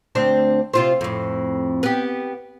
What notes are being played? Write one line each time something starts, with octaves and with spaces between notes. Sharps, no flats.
D2 C4 D4
C3 F4 C5
F2 A2
B3 G4